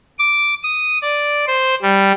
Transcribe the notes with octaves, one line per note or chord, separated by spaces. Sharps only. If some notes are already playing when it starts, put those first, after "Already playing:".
D6
D#6
D5
C5
G3